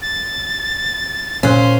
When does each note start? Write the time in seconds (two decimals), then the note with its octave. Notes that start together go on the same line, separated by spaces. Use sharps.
0.02 A6
1.43 A#2 C#4 C5 C6 F#6